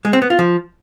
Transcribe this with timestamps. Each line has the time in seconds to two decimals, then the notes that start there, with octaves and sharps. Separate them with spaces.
0.05 G#3
0.13 C4
0.22 B3
0.30 F4
0.39 F3